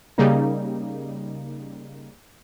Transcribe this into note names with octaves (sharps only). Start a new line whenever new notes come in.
C#3 G3 A#3 D#4